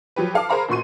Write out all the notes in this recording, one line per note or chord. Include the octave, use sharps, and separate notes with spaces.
F3 F#3 G4 B4
A4 F5 A5 D6
G#4 A#4 C5 F5 A#5 B5
A1 A#2 F#4 C6 D#7